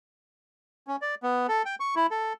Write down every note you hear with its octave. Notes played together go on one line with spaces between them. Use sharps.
C#4
D5
B3
A4
G5
C#6
E4
A4